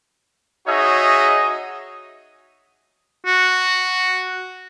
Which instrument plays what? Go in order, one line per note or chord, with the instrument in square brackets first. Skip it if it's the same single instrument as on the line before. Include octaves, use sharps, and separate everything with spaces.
[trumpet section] D#4 F#4 G#4 C#5 D#5 E5
[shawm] F#4